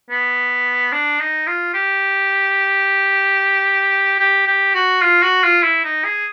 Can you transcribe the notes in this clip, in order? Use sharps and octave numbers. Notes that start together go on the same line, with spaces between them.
B3
D4
D#4
F4
G4
G4
G4
F#4
F4
F#4
F4
E4
D#4
G#4